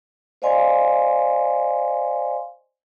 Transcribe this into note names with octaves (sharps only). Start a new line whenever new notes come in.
C5 D5 D#5 F5 G#5 C6